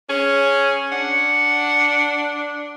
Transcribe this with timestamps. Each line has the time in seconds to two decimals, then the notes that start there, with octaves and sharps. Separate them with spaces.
0.10 C#4 G#4
0.92 D4 F#5